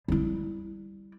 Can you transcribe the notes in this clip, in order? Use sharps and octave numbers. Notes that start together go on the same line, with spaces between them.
G3 E4